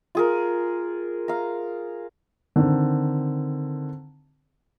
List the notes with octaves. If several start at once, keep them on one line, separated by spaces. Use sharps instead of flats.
F4 G#4 A#4
F5 A#5
D3 D#3 C4